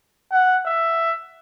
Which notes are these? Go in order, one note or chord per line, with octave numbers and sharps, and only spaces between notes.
F#5
E5